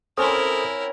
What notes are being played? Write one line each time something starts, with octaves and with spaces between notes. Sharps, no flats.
C4 C#4 E4 A4 A#4 C5 F#5 D#6